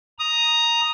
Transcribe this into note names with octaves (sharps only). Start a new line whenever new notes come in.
A#5 D#6